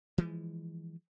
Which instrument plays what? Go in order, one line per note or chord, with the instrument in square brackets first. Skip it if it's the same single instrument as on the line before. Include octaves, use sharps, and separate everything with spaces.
[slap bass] E3 F3 G#3